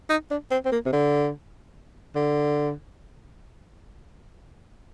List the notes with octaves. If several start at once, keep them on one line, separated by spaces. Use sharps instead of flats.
D#4
D4
C4
C4
A#3
C3
D3
D3